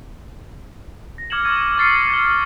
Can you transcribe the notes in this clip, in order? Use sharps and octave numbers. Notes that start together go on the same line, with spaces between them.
A#6
D6 F6 G#6 C#7 E7 F#7
C#6 D6 E6 G#6 A6 D#7
C#6 F6 A6 C7 C#7
F6 G#6